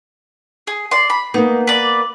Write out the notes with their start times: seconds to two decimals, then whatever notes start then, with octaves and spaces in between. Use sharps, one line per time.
0.67 G#4
0.91 D5 C6
1.10 B5
1.34 A#3 B3 D#4
1.67 B4 D5